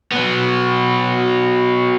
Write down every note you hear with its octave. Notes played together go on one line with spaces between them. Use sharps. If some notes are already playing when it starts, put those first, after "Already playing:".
F#3 B3